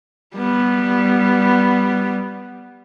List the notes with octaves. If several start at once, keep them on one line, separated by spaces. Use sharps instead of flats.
G3 B3